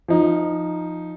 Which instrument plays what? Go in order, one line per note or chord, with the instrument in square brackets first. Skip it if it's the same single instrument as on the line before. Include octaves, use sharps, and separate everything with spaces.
[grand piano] F3 D#4